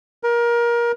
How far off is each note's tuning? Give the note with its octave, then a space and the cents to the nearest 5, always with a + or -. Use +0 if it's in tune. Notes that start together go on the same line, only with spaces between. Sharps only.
A#4 +25